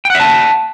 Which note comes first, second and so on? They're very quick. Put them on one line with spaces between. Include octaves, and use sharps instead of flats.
G5 F#5 E5 A5